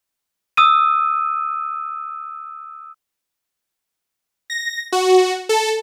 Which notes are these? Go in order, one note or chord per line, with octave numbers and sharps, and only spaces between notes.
D#6 E6 D#7
A#6
F#4
A4